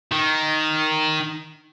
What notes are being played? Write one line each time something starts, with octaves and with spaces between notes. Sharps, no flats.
D#3